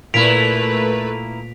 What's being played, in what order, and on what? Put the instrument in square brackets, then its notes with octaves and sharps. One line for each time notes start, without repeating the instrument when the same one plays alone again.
[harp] A#2 [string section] A3 B4 [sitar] A#3 E4 [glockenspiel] B6 D7 F7